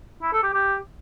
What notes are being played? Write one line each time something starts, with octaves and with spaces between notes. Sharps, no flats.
E4
A4
G4
G4